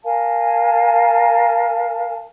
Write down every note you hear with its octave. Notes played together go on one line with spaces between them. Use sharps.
A#4 F5 G#5 A5